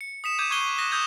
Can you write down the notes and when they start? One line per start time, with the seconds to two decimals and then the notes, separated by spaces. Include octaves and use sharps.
0.01 C#7
0.24 D#6 B6 E7
0.38 D6 G6 G#6 D#7 E7
0.50 C#6 F#6 G#6 C7 D#7 G7
0.78 D#6 F#6 A#6 D#7
0.91 D#6 E6 G6 G#6 E7